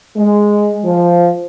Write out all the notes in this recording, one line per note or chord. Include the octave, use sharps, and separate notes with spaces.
G#3
F3